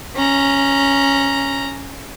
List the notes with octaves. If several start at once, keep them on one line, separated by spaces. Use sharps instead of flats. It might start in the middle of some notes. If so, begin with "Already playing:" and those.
C#4 A#5